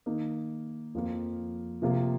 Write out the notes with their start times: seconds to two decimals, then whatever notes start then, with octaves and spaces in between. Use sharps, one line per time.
0.06 D#3 A#3 D#4
0.95 F2 F3 A#3 F4
1.82 C3 F3 A#3 F4